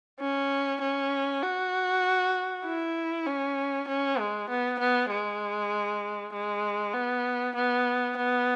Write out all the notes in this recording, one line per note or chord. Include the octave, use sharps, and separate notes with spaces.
C#4
C#4
F#4
E4
C#4
C#4
G#3
B3
B3
G#3
G#3
B3
B3
B3